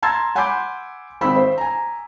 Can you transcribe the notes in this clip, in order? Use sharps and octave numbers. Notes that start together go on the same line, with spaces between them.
A5 A#5 C6 E6 G#6 A6
F#5 G#5 B5 C6 D6 G6
G#1 C4 B5 E6 B6
C5
G#5 A#5